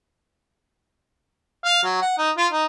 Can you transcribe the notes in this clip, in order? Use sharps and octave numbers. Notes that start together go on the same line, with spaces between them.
F5
F#3
F#5
D#4
F4
D#4